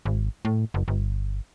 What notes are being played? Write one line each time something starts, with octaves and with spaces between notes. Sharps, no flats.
G#1
A2
F#1
G1